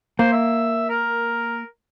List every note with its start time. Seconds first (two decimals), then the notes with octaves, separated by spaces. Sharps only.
0.19 A#3 C5
0.32 E5
0.89 A#4